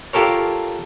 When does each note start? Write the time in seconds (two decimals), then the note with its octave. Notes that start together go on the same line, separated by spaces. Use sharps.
0.13 F4 G4 A4 A#4 C#5